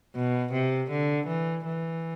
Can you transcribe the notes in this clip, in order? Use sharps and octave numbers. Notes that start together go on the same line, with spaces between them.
B2
C3
D3
E3
E3